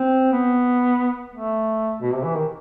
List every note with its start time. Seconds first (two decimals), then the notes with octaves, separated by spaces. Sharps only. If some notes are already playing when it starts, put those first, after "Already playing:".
Already playing: C4
0.32 B3
1.34 A3
2.02 B2
2.13 C3
2.24 E3
2.36 D#3